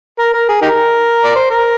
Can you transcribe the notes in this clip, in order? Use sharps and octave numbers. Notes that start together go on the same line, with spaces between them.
A#4
A#4
G#4
D#4 G4 A#4
D5
C5
A#4